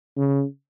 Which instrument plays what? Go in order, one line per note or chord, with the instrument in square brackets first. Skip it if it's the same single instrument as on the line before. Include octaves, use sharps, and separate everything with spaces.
[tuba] C#3